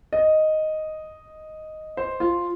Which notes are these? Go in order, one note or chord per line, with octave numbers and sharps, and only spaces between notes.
D#5
C5
F4